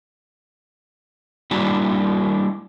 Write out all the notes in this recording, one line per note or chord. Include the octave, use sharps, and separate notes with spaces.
G3 A#3 D4 E4 F#4